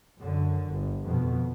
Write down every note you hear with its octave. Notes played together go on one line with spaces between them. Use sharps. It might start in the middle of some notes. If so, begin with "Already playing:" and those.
F#2 D3
G1
F2 B2